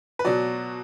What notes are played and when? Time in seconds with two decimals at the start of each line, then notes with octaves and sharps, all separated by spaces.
0.19 B4
0.25 B2 F#3 D5